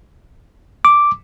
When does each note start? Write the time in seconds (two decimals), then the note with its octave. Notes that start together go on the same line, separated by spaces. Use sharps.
0.85 D6